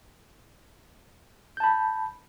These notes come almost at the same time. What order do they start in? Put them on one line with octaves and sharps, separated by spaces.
G6 A5 B5